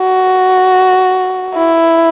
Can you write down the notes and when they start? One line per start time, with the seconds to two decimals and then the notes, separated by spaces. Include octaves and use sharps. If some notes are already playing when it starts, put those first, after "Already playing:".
Already playing: F#4
1.55 E4